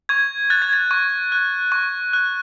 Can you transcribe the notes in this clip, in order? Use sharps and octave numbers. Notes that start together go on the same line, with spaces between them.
C#6 G#6
F#6 A6
G#6
A6
C#6
F#6
C#6
F#6